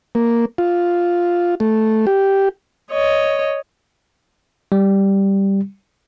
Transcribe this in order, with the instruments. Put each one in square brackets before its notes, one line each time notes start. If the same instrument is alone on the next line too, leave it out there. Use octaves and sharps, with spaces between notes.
[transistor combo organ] A#3
F4
A3
G4
[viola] C#5 D#5
[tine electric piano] G3